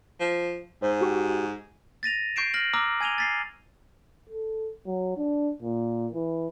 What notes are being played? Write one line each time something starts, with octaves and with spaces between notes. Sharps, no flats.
F3
G#2 C5
F#4 G4 C#6
A6 A#6 D#7 F7
C#6 G6 C7 D7 E7
F6 A#6 F#7
A#5 D6 E6 F6
G#5 G#6 D#7 F7 G7
A6 B6 C7
A4
F#3
D4
A#2
E3